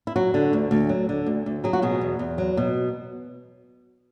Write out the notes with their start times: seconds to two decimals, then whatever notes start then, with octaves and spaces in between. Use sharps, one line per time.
0.07 E4
0.16 F#3 F#4
0.34 D3
0.53 D2
0.71 D2
0.89 F#3
1.09 D3
1.26 D2
1.46 D2
1.64 F#3 G#4
1.73 F#4
1.82 B2 G#4
2.01 E2
2.19 E2
2.38 F#3
2.57 B2